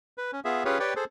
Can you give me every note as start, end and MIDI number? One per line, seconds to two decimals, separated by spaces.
0.18 0.31 71
0.32 0.40 61
0.45 0.64 59
0.45 0.64 65
0.45 0.64 68
0.45 0.64 76
0.65 0.79 61
0.65 0.79 65
0.65 0.79 67
0.65 0.79 68
0.65 0.79 71
0.65 0.79 73
0.80 0.94 67
0.80 0.94 71
0.80 0.94 73
0.80 0.94 74
0.80 0.94 79
0.96 1.05 68
0.96 1.05 69
0.96 1.05 72